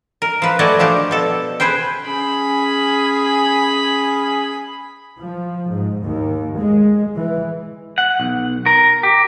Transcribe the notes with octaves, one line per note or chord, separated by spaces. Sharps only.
A#4
F3 B4
A3 F#4 D5 D#5 G#5
A#2 F3 D4 G4
B2 A4
G#4 B4 C5 G5
C#4 G#4 B5
F3
G#2
D#2
G#3
E3
F#5
B1
A#4
G4